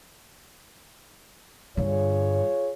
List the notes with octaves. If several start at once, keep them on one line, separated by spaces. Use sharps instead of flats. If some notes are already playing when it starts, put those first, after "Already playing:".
G2 D3 F4 G#4 C#5